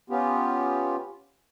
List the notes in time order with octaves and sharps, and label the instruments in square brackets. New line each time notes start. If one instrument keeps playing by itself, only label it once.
[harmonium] B3 C#4 F4 G4